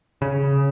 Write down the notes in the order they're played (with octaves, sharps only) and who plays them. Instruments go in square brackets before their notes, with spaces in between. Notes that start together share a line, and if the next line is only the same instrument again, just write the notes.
[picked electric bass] C#3